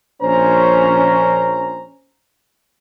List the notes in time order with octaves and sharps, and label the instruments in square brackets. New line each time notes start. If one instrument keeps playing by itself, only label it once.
[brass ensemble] A#1 C#4 C5 A#5